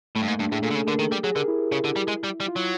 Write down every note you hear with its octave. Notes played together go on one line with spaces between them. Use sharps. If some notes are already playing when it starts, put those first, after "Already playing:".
A2 A3
G2
G#2 A#3
G2 D4
A2 G#4
A#2 A4
D3
C#3 G#4
D3 A#4
D#3 A4
G3 G4
F#3 G#4
D3 A#4
E4
C#3
D3
G3
G#3
G3
G3
F4
F#3 E4